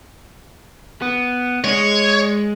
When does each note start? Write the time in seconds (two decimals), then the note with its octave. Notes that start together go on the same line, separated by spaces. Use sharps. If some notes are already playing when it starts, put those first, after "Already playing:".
1.02 B3
1.64 G#3 C#5